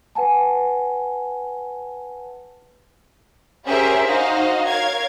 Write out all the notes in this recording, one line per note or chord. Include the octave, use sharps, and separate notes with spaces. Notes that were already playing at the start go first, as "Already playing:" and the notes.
B4 F#5 G#5 A5
C#4 G4 G#4 A#4 C5 E5
D#4 F#4 C5 D#5 F5
A#4 C#5 F5 G#6